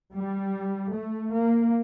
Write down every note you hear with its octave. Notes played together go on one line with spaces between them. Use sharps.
G3
A3
A#3